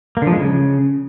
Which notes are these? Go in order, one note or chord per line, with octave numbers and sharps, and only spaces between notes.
A#3
D3
F3
G#3
C#3